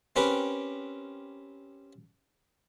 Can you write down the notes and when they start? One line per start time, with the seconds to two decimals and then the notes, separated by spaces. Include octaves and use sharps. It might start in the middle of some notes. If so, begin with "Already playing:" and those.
0.16 C4 C#4 G4 A#4 B4